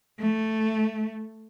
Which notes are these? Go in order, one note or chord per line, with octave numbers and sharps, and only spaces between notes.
A3